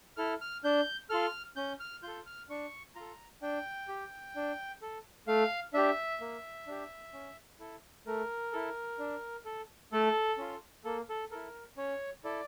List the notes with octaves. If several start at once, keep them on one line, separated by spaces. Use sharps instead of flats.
E4 A4 F6
F6
D4 G6
F4 A4 F6
C#4 G6
F6
F4 A4 G6
F6
D4 C#6
F4 A4 A#5
D4 G5
G4
D4
A4
A3 F5
D4 G4 E5
A#3
D4 G4
C#4
E4 A4
A3 A#4
E4 A4
D4
A4
A3 A4
C#4 F4
A#3 A4
A4
E4 A4 A#4
C#4 C#5
E4 A4 D5